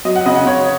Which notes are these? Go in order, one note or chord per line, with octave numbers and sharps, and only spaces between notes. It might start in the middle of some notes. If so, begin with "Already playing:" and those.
F#3 D#5
F#5
C#3 D#5
F#5
C#3 C#5